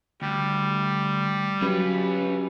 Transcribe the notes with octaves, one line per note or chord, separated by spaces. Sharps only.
D2 G3
F#3 C#4 F4 G4 B4